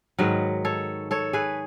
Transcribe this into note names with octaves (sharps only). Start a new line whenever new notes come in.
G#2 D#3 F#3 B4 D#5
A4 C#5
A4 C#5
G#4 B4